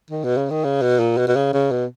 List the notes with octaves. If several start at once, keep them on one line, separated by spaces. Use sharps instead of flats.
D#3
B2
C#3
D#3
C#3
B2
A#2
B2
B2
C#3
C#3
B2